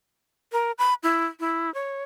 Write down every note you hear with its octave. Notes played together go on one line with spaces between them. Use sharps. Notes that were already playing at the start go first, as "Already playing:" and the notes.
A#4
B5
E4
E4
C#5